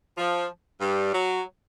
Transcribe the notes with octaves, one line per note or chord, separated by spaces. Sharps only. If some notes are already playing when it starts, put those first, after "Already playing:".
F3
G2 G3
F#3